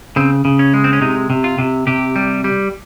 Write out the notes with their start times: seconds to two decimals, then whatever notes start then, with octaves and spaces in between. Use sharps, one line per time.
0.16 C#3 C4
0.45 C#3
0.59 C#4
0.74 G#3
0.84 C4
0.93 C#4
1.01 C3 D#4
1.30 C3
1.44 F4
1.59 C3
1.87 C3 G4
2.16 G3
2.44 G3